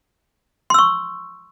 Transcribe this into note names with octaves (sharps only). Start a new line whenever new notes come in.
C6 C#6 E6